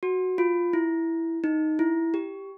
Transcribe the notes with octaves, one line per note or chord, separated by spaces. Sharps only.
F#4
F4
E4
D#4
E4
G4